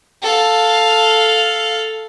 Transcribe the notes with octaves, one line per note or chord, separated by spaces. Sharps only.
A4 F5